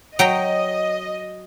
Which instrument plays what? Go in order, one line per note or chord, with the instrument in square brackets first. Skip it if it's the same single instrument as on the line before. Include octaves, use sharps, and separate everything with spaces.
[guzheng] F#3 G5 A#5 [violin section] D#5